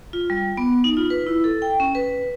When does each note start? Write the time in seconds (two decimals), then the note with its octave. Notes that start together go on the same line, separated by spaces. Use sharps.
0.13 F4
0.30 G3
0.57 B3
0.84 D#4
0.97 F4
1.10 B4
1.27 E4
1.44 A4
1.62 G5
1.80 C#4
1.95 B4